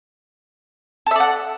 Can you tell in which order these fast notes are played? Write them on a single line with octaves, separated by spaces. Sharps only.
A4 E5 D5 F#5